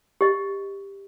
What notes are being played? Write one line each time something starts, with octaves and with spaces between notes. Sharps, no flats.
G4 D#5